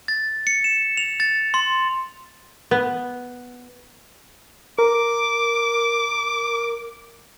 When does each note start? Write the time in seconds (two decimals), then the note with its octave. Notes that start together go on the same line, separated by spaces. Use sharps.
0.08 A6
0.47 C#7
0.64 E7
0.97 F7
1.20 A6
1.54 C6
2.71 B3
4.78 A#4 D6